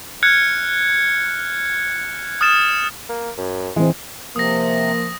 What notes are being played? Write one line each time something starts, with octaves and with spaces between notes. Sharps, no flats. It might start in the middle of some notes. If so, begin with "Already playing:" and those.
F6 F#6 G#6 C#7
D#6 F6 A6 E7
A#3
F#2
E3 G#3 C4
C3 F3 A#3 D#6 A#6